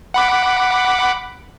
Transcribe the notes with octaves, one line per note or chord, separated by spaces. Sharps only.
F#5 B5 D6